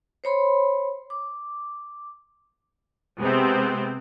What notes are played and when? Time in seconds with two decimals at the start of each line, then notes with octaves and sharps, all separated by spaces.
0.24 C5 C#5 B5 C6
1.10 D6
3.19 C3 G#3 B3 C4